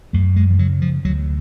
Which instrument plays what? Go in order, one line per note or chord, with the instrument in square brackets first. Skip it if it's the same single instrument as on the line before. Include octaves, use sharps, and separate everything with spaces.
[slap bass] F#2 A3
G#3
F3
C#3 F#3
F3
D2 F#3